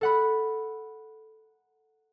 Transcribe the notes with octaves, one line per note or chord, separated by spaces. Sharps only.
A4 F#5 B5